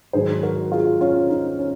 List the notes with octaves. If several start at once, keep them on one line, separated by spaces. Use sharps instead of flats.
G#2 D#3 F#3 G#4 C5
F#4 A#4
F4 G#4
C#4 F4
D#4
C#4